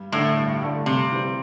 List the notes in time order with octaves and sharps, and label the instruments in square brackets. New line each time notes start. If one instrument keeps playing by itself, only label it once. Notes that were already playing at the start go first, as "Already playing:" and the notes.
Already playing: [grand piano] G2
[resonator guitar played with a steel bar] A2 [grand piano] D3 A3 D4 A4
[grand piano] G2
D3 A3 D4 A4
[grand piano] G2 [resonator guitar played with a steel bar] C3
[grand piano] E3 G3 C4